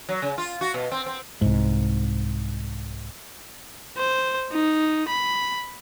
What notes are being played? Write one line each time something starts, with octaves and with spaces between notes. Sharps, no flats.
F#3
C#3
F4
F#4
B2
C4
C4
C2 G#2
C5
D#4
B5